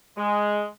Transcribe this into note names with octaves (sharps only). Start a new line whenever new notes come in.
G#3